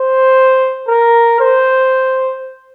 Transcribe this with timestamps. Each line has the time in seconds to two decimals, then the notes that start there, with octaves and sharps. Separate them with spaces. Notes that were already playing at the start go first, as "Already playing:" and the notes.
Already playing: C5
0.88 A#4
1.41 C5